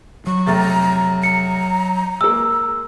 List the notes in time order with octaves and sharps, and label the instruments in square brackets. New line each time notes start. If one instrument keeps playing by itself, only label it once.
[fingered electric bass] F#3 [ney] C#6
[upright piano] F1 A3 A6 [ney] A#5
[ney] A#5 [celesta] C#7
[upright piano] G#3 A#3 [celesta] E6